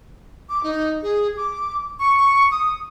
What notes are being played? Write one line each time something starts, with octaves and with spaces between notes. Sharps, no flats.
D6
D#4
G#4
D6
C#6
D#6